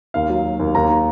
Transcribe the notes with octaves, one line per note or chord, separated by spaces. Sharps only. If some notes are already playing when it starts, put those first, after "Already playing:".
D#2 F5
F#3
F#3
D#2
D#2 A#5